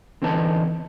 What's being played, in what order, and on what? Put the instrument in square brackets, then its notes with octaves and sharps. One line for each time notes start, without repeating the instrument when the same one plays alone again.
[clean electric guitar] D3 E3 C4 D#4 B4 A5